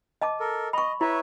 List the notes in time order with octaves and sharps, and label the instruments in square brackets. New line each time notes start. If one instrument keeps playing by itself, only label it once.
[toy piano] D#5 A5 D6
[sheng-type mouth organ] A4 A#4
[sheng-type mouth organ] D#5 [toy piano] B5 C#6
[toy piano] E4 [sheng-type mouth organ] B4 C#5 E5